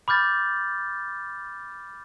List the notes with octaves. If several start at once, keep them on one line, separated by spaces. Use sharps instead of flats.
B5 D6 F6 G6 A6